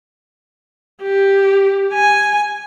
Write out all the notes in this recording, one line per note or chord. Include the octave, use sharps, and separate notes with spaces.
G4
G#5